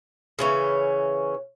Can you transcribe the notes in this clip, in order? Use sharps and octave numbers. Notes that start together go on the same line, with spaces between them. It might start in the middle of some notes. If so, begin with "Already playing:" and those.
C#3 E3 C#4